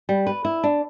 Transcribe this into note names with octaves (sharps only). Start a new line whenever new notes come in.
G3
B4
E4
D4